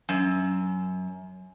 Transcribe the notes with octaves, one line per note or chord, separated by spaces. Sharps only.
F#2